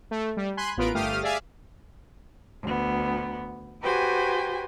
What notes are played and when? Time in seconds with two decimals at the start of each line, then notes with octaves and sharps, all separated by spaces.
0.11 A3
0.37 G3
0.57 G#5 B5 C6 F#6
0.77 A1 B3 F4 A#4 B4 D7
0.95 G1 A3 G4 F5 D#6 F6
1.23 G#4 D5 E5 F5 G#5
2.63 D2 B3
3.83 F#4 G4 B4 C5 G5 G#5